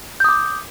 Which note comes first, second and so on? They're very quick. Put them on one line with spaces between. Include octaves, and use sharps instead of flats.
G6 D#6 D6